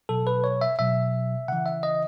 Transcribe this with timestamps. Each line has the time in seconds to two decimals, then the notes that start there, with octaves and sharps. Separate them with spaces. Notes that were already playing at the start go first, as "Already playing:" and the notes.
0.09 B2 F#3 A4
0.27 B4
0.44 C#5
0.61 E5
0.79 B2 F#3 E5
1.48 C#3 E3 F#5
1.66 E5
1.83 D#5